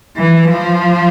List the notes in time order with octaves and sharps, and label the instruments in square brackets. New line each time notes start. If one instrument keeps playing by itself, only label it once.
[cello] E3
F3